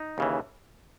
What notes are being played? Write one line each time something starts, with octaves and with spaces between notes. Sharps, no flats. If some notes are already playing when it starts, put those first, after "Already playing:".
Already playing: D#4
D#2 C#3 E3